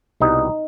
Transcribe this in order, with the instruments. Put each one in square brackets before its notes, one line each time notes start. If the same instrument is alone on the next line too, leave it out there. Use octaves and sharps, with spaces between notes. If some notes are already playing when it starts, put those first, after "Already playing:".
[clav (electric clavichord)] C2 B2 G3 D#4